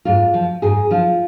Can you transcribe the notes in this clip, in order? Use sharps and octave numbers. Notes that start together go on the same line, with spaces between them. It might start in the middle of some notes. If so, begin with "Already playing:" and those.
G#2 F4
F3
G#2 G#4
F3 F4